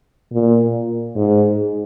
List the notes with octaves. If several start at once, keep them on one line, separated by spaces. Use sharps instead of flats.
A#2
G#2